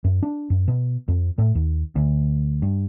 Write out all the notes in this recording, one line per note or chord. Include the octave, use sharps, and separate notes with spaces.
F#2
D4
F#2
B2
F2
A2
D#2
D2
G2